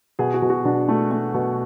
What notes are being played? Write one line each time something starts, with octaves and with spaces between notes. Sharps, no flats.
B2 G#4
F#4
B2
F#4
B2 D4
A3
A3
B2